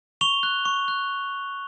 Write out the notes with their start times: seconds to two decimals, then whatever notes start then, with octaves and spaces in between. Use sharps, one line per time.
0.21 C#6 F7 G7
0.43 F#6
0.65 C#6
0.88 F#6